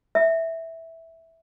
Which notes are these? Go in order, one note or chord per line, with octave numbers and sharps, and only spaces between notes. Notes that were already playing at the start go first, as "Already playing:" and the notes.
E5